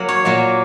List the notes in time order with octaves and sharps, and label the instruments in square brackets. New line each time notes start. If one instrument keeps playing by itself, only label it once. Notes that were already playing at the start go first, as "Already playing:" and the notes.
Already playing: [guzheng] F#3 A#3 F#5
C#5
A#2 F#3 A#3